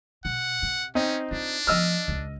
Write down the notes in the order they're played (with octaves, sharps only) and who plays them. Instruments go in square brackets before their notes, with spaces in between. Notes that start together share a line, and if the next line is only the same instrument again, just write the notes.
[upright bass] B2 [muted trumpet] F#5
[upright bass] C3
[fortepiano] C4 D#4 [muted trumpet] C#4
[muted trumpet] D4 [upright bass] F4
[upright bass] F3 A3 [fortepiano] D#5 E6 F6
[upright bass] C#2 C#4